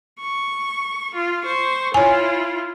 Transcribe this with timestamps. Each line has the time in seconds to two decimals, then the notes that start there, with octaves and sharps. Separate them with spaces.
0.20 C#6
1.14 F4
1.43 C5 C#6
1.94 E4 F4 C#5 G#5